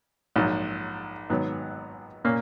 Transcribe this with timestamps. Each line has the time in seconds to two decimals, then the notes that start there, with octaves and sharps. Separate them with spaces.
0.36 A#1 G#2 F#3
1.30 G#1 G#2 F#3 B3
2.24 A#2 A#3 C#4